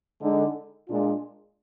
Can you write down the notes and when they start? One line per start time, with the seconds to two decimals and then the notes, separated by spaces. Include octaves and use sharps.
0.21 D3 G#3 D#4
0.88 A#2 G#3 D4 F4